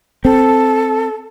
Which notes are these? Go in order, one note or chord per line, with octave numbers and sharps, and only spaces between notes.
C4 A4